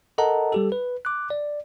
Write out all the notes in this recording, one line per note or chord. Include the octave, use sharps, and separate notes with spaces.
A4 A#4 D#5 F#5 A5 A#5
G3 G4 A4
B4
D6 F#6
D5